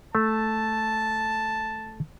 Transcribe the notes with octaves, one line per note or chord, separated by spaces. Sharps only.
A3 A5